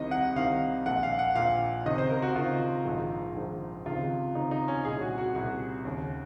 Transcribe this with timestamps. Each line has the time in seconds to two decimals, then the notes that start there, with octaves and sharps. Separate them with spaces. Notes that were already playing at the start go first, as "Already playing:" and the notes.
Already playing: C2 C3 D#3 D#5
0.11 F#5
0.36 C2 C3 D#3 F5
0.86 A#1 A#2 F#5
1.03 F5
1.19 F#5
1.35 A#1 A#2 F5
1.85 C#2 C3 D#3 D#5
1.98 C5
2.10 A#4
2.22 F#4
2.35 C#2 C3 D#3 F4
2.86 A#1 G#2 D#3
3.36 A#1 G#2 D#3
3.85 C#2 C3 D#3 F4
4.35 C#2 C3 D#3 D#4
4.51 D#4
4.68 C#4
4.85 C2 A#2 G#4
5.01 F#4
5.18 F#4
5.35 C2 A#2 F#4
5.85 D#2 C#3